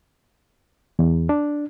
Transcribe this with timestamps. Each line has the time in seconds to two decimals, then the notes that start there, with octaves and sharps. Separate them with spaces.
0.99 E2
1.29 D4